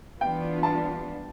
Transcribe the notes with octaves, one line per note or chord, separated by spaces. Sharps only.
E3 B3 D4 F4 G5
A5